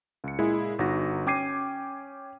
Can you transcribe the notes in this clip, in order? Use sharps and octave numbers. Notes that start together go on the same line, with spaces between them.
C#2 C#7
A#2 G#3 E4 G#4
G1 D#4 F#4 A#6
C#4 G5 D6 G#6 C7 D#7